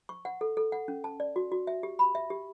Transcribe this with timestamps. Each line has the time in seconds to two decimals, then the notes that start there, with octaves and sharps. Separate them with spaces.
0.09 C#6
0.25 F#5
0.41 A4
0.57 A4
0.72 F#5
0.88 C#4
1.04 A5
1.20 D5
1.36 F#4
1.52 F#4
1.67 E5
1.83 G4
1.99 B5
2.15 E5
2.30 G4